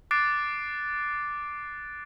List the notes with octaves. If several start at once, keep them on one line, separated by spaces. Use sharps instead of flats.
D6 F#6 A6 C7 D7